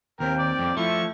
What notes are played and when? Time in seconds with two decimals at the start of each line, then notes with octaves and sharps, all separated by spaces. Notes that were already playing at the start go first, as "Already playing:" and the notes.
0.20 D#2 C4 A#4 G5
0.39 D5
0.59 F2
0.77 F3 A3 E4 C#6